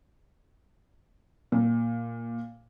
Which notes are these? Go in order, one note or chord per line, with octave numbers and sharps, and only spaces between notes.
A#2